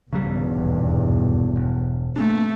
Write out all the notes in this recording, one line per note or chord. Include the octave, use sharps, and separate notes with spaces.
B1 E2 G2 C#3 F#3 G3
D#1
E1
A3 A#3 C4 D4